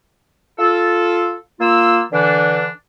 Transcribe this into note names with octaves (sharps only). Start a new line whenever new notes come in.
F4 A4
A#3 F4 E6
D3 E3 D4